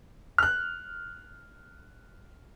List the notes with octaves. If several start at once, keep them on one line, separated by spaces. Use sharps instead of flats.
F6 F#6